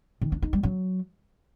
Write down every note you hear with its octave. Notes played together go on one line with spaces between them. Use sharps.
D#3
D4
D#4
G3
F#3